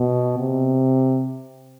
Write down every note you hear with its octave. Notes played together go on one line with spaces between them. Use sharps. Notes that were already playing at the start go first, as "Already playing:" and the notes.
Already playing: B2
C3